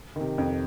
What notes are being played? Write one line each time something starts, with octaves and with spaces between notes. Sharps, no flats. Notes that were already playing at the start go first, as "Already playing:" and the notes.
C3 D#3
F2